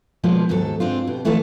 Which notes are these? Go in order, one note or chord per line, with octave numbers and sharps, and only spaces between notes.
B2 F3 G#3 A#3
D#2 G#2 F#3 A4
G#2 C4 D4 F4
B2 G4
E3 A3 B3 F4 A4